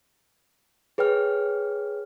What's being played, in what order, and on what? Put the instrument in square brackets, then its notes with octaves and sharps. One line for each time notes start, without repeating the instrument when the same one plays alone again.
[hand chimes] G#4 B4 C#5 G5 F6